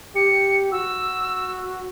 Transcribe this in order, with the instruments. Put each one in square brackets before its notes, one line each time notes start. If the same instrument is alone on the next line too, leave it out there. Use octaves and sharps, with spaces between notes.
[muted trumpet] G4 [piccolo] C#7
[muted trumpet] F#4 [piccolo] E6